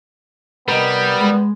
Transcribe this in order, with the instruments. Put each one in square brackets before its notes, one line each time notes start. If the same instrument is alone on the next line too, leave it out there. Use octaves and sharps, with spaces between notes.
[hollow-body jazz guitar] C2 D#5 [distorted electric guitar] G3 [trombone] B3 [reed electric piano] A#4
[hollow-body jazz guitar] G#3